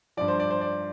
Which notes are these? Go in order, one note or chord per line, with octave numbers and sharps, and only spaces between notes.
G2 F3 D5
C5
D5
C5
D5